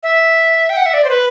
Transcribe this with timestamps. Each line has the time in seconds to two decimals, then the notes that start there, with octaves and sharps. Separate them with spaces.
0.03 E5
0.70 G5
0.77 F#5
0.86 E5
0.94 D5
1.05 C5
1.10 B4